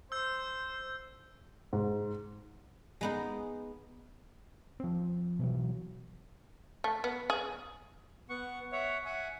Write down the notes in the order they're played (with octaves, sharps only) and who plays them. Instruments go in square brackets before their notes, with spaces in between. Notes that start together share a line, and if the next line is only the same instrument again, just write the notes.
[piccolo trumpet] C5 [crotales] E6 G6
[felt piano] G#2
[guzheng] G#3 B3 D#4
[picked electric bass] F3 C4
B2 E3 F#3
[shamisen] A3
B3
G#4
[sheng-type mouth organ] B3 F#5 C#6
C#5 E5 F#5
E5 F#5 G#5